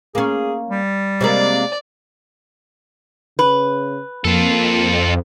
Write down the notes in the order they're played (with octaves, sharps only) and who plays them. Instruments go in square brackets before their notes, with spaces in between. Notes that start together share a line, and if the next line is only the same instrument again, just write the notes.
[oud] A#3 C#4 [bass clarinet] G#4
[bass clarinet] G3
[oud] C3 G#3 A#3 [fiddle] D5
[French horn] C#3 [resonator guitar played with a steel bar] B4
[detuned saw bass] F2 [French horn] A#3 [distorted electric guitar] F4 A4